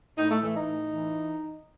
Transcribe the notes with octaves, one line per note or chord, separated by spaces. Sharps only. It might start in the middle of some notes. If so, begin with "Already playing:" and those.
A2 D#4
A3
E3 A3
D#4
A2
E3